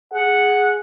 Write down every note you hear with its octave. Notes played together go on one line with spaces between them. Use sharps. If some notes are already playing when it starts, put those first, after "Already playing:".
G#4 F#5